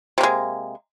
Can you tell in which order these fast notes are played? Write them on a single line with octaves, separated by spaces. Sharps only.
C3 A#3 G#3